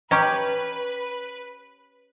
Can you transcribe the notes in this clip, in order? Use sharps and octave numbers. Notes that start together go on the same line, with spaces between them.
C#4 G4 B4 D#5 A#5 C#6